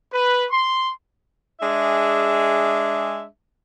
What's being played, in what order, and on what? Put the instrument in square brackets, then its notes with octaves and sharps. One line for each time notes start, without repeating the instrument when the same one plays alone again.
[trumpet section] B4
C6
[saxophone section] G#3 D4 G#4 E5